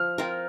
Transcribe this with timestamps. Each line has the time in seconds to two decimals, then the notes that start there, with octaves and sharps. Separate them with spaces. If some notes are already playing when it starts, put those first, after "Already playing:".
Already playing: F3 F6
0.18 C4 F4 A#4